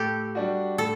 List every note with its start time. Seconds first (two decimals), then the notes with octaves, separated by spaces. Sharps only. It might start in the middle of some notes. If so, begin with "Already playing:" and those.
Already playing: A2 G4 A4
0.35 G3 D4 F#4
0.78 A2 A4